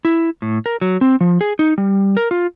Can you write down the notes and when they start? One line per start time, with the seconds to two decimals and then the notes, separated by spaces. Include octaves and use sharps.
0.05 E4
0.42 A2
0.66 A#4
0.81 F#3
1.01 C4
1.21 F3
1.41 G#4
1.59 D#4
1.78 G3
2.17 A#4
2.31 F4